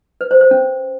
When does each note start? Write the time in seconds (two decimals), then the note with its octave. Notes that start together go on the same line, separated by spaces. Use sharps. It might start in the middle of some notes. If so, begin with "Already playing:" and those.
0.21 B4
0.31 C5
0.41 C5
0.51 C#4